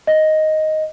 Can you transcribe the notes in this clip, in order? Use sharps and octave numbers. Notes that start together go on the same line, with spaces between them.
D#5